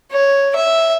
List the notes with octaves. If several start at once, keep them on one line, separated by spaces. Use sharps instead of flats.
C#5
E5